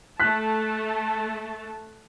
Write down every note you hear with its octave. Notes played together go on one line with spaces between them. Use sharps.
A3 A5 F#6 B6